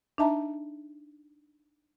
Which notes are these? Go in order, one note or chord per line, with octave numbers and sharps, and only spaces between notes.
D4 D#4 D#5 E5 A5 A#5